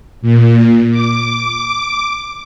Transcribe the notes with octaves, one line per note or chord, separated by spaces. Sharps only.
A#2
D6